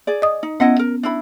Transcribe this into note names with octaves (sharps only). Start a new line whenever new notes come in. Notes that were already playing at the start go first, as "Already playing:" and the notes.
G#4 D5
D#5 D#6
D#4
B3 C#4 E4 D#5 F#5
A#4
D4 E4 B5